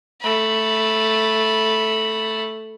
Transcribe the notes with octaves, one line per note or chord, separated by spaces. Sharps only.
A3 B5